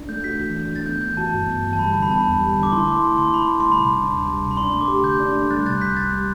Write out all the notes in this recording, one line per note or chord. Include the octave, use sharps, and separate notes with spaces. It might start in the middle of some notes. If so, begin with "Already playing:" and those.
Already playing: D4
A3 G6
F#4 G6 B6
E3
D4
A3 A6
B3 G6
E3 G6
F#4 A5
G2
B3
E3
A5
G3 B5
D3
B5
B3 A5
B5
E2
G3
D3
D6
E4 C6
A3 D6
C6
D3
D3 C6
E4 B5
A3 B5
G3 C6
B5
C3
D4
D2
G3
C3
B5
D4 C6
A3
D6
G4
D3 G6
D4
A3
G3 F#6 A6
C3 F#6 A6
C2 G6 B6
C2 F#6 A6
G3